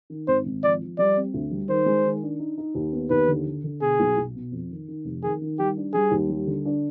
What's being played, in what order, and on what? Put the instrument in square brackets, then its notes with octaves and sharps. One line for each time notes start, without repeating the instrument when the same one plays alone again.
[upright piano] D#3
[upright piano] G#1 [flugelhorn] C5
[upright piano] G#1
[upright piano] F3 [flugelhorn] D5
[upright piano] F3
[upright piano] G3 [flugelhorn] D5
[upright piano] C4
D2
G3
[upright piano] D#3 [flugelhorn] C5
[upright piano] G#3
D#3
D4
D#4
D#4
D#2
B3
[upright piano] D#2 [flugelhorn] B4
[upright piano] D3
D3
D3
[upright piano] B2 [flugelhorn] G#4
[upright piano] B1
B1
B2
F2
D#3
D#3
F1
[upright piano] D#3 [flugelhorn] G#4
[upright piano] D#3
[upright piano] G3 [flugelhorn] G4
[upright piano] D4
[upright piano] G3 [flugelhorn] G#4
[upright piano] D#2
G3
D3
D4